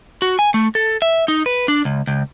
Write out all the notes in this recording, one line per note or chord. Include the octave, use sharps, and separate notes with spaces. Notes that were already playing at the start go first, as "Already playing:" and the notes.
F#4
G#5
A3
A4
E5
D#4
B4
D4
C#2
C#2